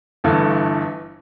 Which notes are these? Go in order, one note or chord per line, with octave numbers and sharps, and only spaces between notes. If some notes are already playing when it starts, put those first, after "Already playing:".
G1 G2 E3 A3